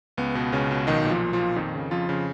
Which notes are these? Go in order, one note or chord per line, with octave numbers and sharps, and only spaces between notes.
C#2 B3
B2
C#2 C#3 C#4
B2
B1 D#3 D#4
A#2
F3 F4
B1
F3 F4
A#2
F2 D#3 D#4
C#3
F2 F3 F4
C#3